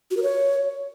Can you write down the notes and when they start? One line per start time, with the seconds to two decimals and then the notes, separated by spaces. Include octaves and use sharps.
0.11 F#4
0.17 A#4
0.23 C#5